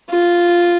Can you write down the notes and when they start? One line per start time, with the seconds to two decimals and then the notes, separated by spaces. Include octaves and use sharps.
0.10 F4